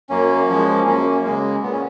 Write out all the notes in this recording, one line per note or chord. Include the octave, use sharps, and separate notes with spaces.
F#2 A#3 C#4
F3 G#3
F#2 A#3 C#4
A#3
C#3 G#3
A#2 B3
C#4